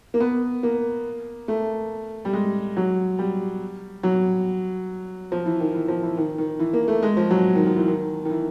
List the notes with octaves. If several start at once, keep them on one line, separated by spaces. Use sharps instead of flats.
A#3
B3
A#3
A3
G3
G#3
F#3
G3
F#3
F3
E3
D#3
E3
F3
E3
D#3
D#3
E3
A#3
A3
G#3
F3
F#3
D#3
D#3
E3
D#3
D#3
E3